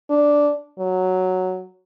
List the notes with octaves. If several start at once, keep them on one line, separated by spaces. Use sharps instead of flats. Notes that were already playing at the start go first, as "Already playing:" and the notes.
D4
F#3